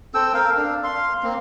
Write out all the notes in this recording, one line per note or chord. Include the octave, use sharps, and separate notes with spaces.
C4 A4 G5 E6
A#4 F5
D4
F5 C6
A#3 C4